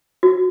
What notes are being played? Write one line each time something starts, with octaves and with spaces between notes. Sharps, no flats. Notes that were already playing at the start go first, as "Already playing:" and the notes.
F#4